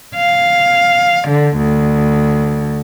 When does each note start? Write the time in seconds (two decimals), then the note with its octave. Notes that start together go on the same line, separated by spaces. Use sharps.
0.16 F5
1.28 D3
1.57 D2